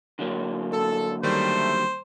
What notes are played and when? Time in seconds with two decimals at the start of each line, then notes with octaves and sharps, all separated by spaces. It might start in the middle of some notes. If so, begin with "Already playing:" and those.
0.19 D3 F#3 A#3
0.72 A4
1.23 D#3 G3 A3 C5